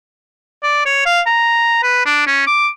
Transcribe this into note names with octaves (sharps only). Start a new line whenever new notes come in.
D5
C#5
F5
A#5
B4
D4
C#4
D6